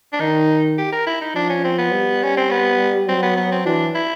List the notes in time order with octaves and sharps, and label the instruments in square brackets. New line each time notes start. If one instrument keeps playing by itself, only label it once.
[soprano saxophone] D4
[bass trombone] D#3 [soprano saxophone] D#4
[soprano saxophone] G4
A#4
E4
D#4
[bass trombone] F3 [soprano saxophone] D4
[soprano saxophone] C#4
C4
B3
[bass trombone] G3
[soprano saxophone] C#4
C4
B3
[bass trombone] F#3 [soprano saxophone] C4
[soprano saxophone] B3
B3
C4
[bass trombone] E3 [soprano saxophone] D4
[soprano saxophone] E4